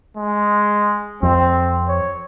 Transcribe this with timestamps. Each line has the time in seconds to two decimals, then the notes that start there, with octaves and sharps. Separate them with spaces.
0.17 G#3
1.23 F2 C4
1.88 C#5